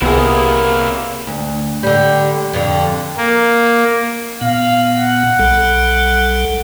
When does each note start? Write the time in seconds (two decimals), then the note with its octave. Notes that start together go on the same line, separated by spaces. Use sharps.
0.02 C2 C3 A#3 B3 E4 G#4
1.27 D2
1.83 D3 G3
2.53 F2 D3
3.17 A#3
4.41 A#2 B3 F5
4.93 F#5
5.39 B1 G3 A4